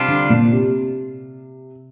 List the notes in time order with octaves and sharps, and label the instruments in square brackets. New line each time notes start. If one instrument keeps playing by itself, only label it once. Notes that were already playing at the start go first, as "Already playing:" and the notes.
Already playing: [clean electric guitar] C3 G3 D4 F4
[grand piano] D3
A#2
C3